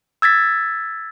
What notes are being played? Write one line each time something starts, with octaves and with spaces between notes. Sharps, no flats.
E6 G#6 A6 B6